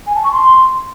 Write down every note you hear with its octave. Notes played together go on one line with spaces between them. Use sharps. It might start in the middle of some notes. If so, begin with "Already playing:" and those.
G#5
A5
C#6
C6